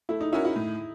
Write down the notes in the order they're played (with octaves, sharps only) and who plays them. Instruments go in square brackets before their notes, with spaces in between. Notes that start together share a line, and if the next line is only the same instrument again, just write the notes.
[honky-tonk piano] A3 [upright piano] E4
[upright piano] D#4
[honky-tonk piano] C#4 F#4 A#4 [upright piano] E4
[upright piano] E4
[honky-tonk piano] A2